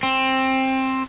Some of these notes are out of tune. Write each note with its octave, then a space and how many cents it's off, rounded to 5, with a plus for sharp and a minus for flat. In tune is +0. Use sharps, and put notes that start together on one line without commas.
C4 +15